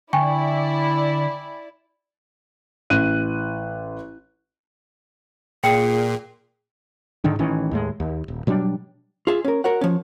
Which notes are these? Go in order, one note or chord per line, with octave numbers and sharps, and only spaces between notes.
D3 E4 D5 G5 G#5 C#6
A1 F#6 D#7
A#2 G#4 G5
G#2 D3 D#3 D4
A1 D#3 E3 C#4
D#2 A2 G#3
D#2
D#1
B2 F#3 G3 D4
F4 G#4 E5
C#4 A#4
F#4 A#4 C#5 F#5
F3 C#4